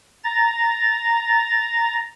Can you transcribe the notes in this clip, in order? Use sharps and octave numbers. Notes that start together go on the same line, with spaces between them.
A#5 A6